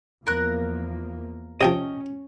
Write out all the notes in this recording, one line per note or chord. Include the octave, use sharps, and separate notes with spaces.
E2 F3 A#3 A#4 F#6
C3 F3 C#4 D#5 G5